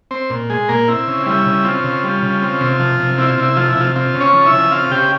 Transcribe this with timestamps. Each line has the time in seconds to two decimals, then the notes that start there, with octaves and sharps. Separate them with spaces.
0.11 C4 C5
0.30 A#2
0.50 G#3 G#4
0.68 A#2 A#3 A#4
0.88 C4 E4
1.07 C#3
1.26 G3 E4
1.46 C#3
1.64 C4 F4
1.84 C#3
2.04 G3
2.23 C#3
2.42 C4
2.61 C3
2.80 F3
3.00 C3
3.18 C4 E4
3.29 F4
3.38 C3 E4
3.57 F3 F4
3.69 E4
3.76 C3 F4
3.96 C4 F4
4.14 C#3
4.20 C#4 C#5
4.33 F3
4.46 E4 E5
4.53 C#3
4.71 C4 F4 F5
4.91 C#3 G4 G5